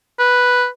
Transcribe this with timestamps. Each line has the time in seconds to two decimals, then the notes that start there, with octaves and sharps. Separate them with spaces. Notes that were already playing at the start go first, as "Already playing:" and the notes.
0.19 B4